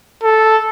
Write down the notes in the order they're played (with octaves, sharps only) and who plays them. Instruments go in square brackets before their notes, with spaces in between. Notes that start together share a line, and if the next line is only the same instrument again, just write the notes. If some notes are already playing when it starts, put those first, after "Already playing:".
[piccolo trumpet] A4